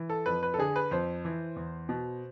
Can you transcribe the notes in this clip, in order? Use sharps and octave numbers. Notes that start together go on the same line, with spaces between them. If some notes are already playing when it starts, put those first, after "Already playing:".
Already playing: E3
A4
F2 B4
B4
A4
D3 G#4
B4
F2 C5
E3
E2
B2